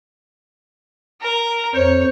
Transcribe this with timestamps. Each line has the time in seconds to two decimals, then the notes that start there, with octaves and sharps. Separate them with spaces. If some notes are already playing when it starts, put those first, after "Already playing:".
1.21 A#4 A#5
1.75 F2 C5 C#5